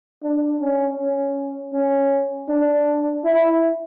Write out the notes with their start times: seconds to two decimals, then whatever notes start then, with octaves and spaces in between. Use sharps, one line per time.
0.23 D4
0.61 C#4
0.99 C#4
1.73 C#4
2.49 D4
3.24 E4